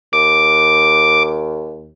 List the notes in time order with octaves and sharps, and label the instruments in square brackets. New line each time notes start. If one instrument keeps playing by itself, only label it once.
[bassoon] D#2 [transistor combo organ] D6